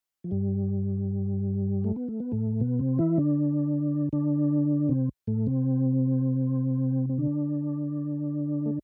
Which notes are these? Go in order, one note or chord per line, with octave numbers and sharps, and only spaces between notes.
F3
G2 G3
A3
B3
A3
B3
A2 A3
B2 B3
C3 C4
E3 E4
D3 D4
D3 D4
C3 C4
A2 A3
C3 C4
C4
D3 D4
A3